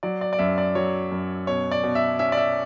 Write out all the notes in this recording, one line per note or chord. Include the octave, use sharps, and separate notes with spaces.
F#3 D5
D5
D5
F#2 E5
D5
F#3 C#5
F#2
B2 C#5
D5
B2
E5
C#4 E5
D5
E5